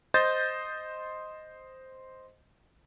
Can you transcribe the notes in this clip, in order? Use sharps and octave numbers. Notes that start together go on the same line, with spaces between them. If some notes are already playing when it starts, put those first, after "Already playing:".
C5 D#5 G6 A6